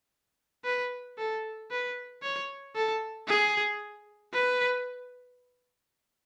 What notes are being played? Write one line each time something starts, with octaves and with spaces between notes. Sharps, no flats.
B4
A4
B4
C#5
A4
G#4
B4